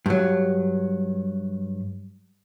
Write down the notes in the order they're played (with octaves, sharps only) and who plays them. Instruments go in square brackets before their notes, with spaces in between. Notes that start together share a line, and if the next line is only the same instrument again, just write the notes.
[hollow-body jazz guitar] G2 F#3